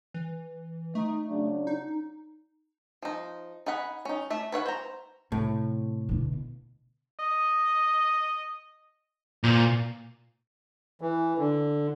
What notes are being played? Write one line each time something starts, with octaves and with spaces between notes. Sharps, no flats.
E3
A3 D#4
C#3 F#3 D4
D#4
F3 D#4
D#4 G#4 F#5 B5
C#4 D#4
A3 E5
B4 C#5 F5 F#5
C5 A#5
A2 C3
B2 D3
D#5
A#2 C5
E3
D3